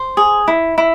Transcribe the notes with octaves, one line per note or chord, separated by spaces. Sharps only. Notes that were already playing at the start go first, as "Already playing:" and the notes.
Already playing: C5
G#4
E4
E4